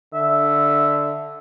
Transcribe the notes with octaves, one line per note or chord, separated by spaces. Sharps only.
D3 E5